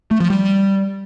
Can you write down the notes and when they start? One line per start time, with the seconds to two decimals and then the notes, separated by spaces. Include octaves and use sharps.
0.11 A3
0.20 F3
0.30 G3